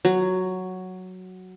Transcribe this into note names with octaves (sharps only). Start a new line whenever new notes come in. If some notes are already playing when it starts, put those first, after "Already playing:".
F#3